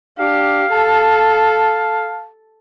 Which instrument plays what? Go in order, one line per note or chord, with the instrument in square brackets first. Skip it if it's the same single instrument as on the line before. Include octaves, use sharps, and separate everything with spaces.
[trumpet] D4 [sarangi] G4 [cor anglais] F5
[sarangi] A4 [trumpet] A5